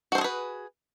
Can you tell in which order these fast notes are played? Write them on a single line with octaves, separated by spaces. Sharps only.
F#4 C5 A4 G#4 B4